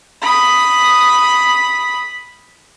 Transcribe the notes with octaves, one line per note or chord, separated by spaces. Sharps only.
B5 D#6